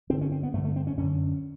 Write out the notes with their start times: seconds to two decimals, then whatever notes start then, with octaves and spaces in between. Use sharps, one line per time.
0.09 G2 D3 C4
0.21 C#4
0.32 C4
0.43 B3
0.54 G2 A3
0.57 D3
0.65 A3
0.76 C4
0.87 C#4
0.97 F#2 D3 C#4